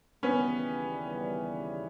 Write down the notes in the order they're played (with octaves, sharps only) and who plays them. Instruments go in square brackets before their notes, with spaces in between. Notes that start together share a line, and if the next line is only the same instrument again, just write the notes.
[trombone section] D#2 C#3 E3 G3 [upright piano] B3 C#4